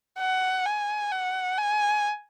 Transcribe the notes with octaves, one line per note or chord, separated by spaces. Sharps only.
F#5
G#5
F#5
G#5